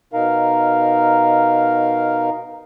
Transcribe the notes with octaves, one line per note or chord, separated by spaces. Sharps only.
B2 D#4 A#4 F5